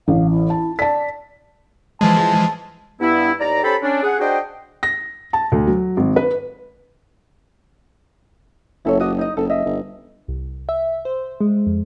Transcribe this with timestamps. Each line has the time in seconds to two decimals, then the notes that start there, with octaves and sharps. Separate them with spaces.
0.08 A1 F5
0.30 E4
0.50 A5
0.79 D5 A5 B6
2.01 E3 F3 G#3 A5
3.00 G2 B3 E4
3.41 D#2 D5 A#5
3.64 C#4 G4 A4 C5 A5 B5
3.83 C#4 D4
4.03 G#4 F#5
4.20 D4 F#4 G#4 C5 D#5 G5
4.83 A#6
5.33 A5
5.52 D2
5.67 F#3
5.97 G#1
6.16 B4
8.85 F#1 E4 A4 C#5
9.00 F#4 G4 D#5
9.18 D#4 D#5
9.37 F#1 A4
9.49 D#5 E5
9.65 G1
10.28 C2
10.69 E5
11.05 C5
11.41 G#3
11.67 F2